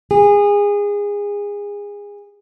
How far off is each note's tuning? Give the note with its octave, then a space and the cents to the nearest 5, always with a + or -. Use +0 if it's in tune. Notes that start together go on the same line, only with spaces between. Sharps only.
G#4 -25